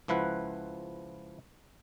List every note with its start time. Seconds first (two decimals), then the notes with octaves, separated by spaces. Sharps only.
0.08 C#2 F3 E4 B4 F#5